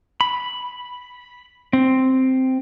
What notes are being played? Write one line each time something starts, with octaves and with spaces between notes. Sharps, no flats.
B5
C4